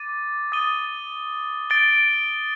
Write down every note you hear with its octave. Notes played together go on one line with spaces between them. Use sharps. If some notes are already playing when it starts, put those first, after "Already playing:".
Already playing: D6 A6 D#7
D#6 A6 D#7 G7
A6 D7 G7